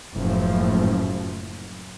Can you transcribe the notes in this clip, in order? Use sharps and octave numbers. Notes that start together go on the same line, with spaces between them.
F#1 F#2 A2 F3